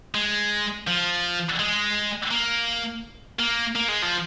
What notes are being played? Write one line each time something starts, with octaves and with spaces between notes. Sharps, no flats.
G#3
F3
G#3
A#3
A#3
A#3
G#3
F3